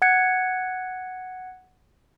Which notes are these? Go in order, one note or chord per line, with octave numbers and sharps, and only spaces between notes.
F#5 F#6 G#6 C#7